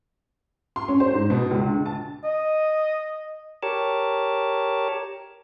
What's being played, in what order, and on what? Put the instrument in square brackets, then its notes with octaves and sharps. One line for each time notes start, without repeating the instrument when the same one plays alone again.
[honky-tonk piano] C6
C#4
C5
G#2
B2
C#2
D3
A5
[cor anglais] D#5
[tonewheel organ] G4 A#4 C#5 A5